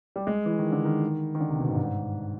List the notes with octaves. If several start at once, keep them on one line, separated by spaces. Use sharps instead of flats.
G3
G#3
E3
D#3
D3
D#3
D#3
D3
C3
B2
G#2
G2
G#2